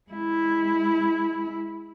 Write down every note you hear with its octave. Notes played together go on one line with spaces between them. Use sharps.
G#3 E4